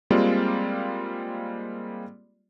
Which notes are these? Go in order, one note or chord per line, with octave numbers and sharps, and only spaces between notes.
G3 G#3 A#3 C4 F4 D5